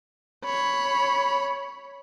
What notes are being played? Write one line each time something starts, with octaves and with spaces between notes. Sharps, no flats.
C#5 B5